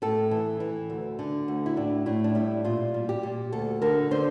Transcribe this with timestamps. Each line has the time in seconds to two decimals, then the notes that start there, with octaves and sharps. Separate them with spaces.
0.02 A2 A4
0.31 E3
0.60 E3
0.90 D2
1.19 D3
1.48 D2
1.66 E4
1.76 A2 D4
2.06 A2 E4
2.24 D4
2.35 G3 E4
2.65 A#2 F4
2.94 G3
3.09 G4
3.23 A#2
3.52 D2 A4
3.82 D3 A#4
4.11 D3 C5